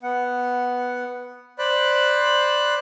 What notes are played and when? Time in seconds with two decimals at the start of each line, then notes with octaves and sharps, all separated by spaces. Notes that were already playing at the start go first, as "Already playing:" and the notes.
0.03 B3 F#5
1.58 C5 D5 B5 F#6